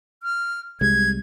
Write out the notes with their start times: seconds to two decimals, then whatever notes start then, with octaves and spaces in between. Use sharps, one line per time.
0.23 F6
0.81 C2 G3 G#3 G#6